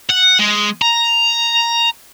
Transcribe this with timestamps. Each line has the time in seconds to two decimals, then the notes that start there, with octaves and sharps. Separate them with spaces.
0.10 F#5
0.39 G#3
0.82 A#5